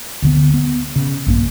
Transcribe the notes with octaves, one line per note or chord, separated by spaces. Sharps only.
D2 D3 B3
B3
C#3
A#1 G2 A#3